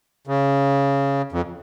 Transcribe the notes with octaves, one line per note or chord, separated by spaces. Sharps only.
C#3
F2